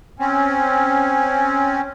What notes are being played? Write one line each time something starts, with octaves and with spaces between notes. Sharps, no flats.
C4 C#4